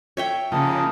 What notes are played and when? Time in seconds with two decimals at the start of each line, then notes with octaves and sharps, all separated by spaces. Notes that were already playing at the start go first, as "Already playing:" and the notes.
0.17 C#5 E5 G5
0.52 C#3 F3 A#3 D#4 A5